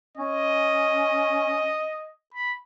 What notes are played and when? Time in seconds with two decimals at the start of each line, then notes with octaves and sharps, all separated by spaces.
0.17 C#4 D#5
2.34 B5